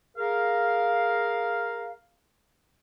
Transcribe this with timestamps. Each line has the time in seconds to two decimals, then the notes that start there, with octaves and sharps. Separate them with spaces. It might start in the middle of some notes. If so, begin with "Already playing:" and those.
0.17 G#4 A#4 F5